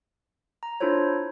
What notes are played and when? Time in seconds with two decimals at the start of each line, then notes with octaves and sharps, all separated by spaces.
0.63 A#5
0.80 D4 E4 F4 A4 C5 C#5